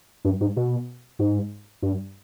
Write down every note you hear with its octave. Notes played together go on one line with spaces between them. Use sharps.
G2
G#2
B2
G#2
G2